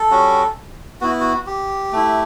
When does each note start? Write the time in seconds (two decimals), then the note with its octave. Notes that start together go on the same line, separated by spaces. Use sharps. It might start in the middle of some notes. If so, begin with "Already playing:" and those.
Already playing: A4
0.11 G3 C#4 F#4
1.01 B3 E4 F#4
1.20 F#4
1.46 G4
1.93 A3 E4